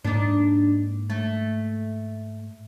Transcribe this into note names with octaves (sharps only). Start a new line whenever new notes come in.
G#2 A#3 D4 D#4
A3